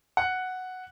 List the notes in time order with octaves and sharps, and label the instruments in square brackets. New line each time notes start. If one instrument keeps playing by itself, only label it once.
[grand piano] F#5 F#6